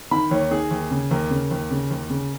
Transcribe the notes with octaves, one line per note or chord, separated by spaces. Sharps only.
D#3 B5
D#2 C#5
D#3 G#4
D#2
C#3
D#2 A#4
C#3
D#2
C#3
D#2
C#3